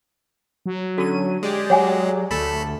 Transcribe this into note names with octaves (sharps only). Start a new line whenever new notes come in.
F#3
D3 C#4 F#4 A4 D#7
G#3 G4 G#4 D5
F#3 C#5 F#5 G#5
D2 A3 A4 A5 B5